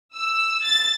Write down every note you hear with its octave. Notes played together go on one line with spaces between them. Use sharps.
E6
A6